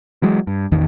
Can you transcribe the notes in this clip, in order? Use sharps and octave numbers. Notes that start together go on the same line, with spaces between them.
E3 F#3 G#3
G2
A1 E2 D#3